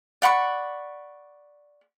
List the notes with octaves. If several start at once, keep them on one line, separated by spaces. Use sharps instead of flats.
D5 F#5 B5 C#6